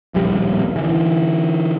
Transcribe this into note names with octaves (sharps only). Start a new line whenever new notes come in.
D1 A#1 D#2 G3
D3 E3